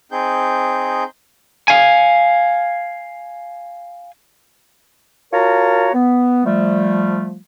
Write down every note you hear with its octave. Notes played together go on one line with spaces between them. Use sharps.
C4 D#4 G#4 G6
F5 G#5
F4 F#4 A#4 C#5 A5 A#5
B3
F3 G3 A3